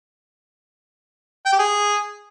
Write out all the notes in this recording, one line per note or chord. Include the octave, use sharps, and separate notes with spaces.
G5
G4
G#4